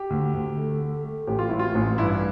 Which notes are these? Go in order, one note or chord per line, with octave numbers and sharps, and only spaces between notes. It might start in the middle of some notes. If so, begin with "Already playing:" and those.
Already playing: G4
D2
D2
A3
A3
A3
A1 G4
F4
A2 E4
F4
A1
G2 E4